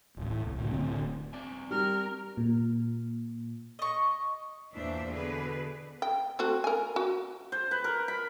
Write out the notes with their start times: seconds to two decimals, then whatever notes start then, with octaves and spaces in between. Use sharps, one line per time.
0.17 D1 A1
0.30 A2
0.44 C2
0.58 A2 D3
0.71 D1 D2 C4
1.33 C4 D5 G#5
1.71 G3 A#4 F6
2.37 A#2
3.79 D#5 C#6
4.74 E2 A#2 E3 D4 C5 E5
5.11 B2 D3 G#4 B4
6.02 G5
6.39 A3 C4 F#4
6.64 A#4 G#5
6.96 F#4
7.52 C5
7.71 B4
7.84 A#4
8.08 B5